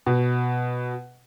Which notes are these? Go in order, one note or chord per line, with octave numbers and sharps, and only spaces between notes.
B2